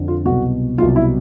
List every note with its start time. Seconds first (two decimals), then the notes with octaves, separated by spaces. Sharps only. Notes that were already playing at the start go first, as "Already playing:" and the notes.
Already playing: F2 D3
0.08 F4
0.25 C2 B2 F#3 F#4
0.78 C2 B2 F#3 F4
0.96 E4